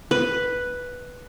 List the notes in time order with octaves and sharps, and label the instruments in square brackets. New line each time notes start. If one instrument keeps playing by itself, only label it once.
[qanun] B4